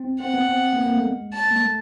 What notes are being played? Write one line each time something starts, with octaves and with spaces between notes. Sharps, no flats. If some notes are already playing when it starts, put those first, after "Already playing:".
Already playing: C4
C4 F#5
B3
C4
A#3
B3
A#3
A3
G#3
A5
A#3
A3